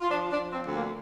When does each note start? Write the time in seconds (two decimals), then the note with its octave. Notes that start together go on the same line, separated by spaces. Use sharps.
0.01 F4
0.10 F3 D4
0.32 D4
0.38 F3
0.52 C4
0.66 D2
0.74 A#3